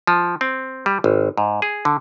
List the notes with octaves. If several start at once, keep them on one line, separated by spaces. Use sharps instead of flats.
F3
C4
G3
G#1
G#2
G#4
D3